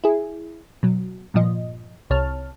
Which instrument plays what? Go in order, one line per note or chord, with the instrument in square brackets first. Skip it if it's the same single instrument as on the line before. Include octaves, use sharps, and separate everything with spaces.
[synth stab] E4 G#4
B2 F#3
G2 A#2 F3 D#5
C2 C3 C#5 A5 F6